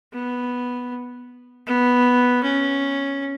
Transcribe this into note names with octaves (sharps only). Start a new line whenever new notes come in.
B3
B3
C#4